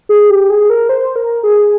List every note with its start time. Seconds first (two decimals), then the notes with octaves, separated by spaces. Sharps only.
0.09 G#4
0.30 G4
0.50 G#4
0.70 A#4
0.89 C5
1.16 A#4
1.43 G#4